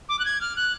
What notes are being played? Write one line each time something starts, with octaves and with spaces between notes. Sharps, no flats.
D6
F#6
G#6
F6
F#6